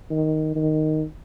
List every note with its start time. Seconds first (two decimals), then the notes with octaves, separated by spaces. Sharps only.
0.10 D#3
0.55 D#3